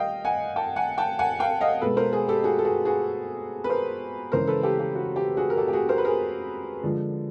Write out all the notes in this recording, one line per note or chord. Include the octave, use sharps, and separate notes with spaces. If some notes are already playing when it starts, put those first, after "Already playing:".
Already playing: G3 D#5 F5 G5
F#5 G#5
G5 A5
F#5 G#5
G5 A5
F#5 G#5
F5 G5
D#5 F5
B2 G#3 A4 B4
A#4 C5
G#4 A#4
G4 A4
F#4 G#4
A4
F#4 G#4
F#4 G#4
B4
A#4 C5
C#3 E3 G#3 A#4 C5
A4 B4
G4 A4
G4
F#4
G4
F#4 G#4
A#4
G4 A4
G4
F#4 G#4
A#4 C5
B4
G#4 A#4
D3 F3 G#3